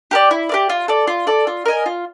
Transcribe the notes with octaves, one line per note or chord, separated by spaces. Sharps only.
G4 A#4 D5
E4
G4 A#4 D5
F4
A4 D5
F4
A4 D5
F4
A#4 D#5 G#5
F4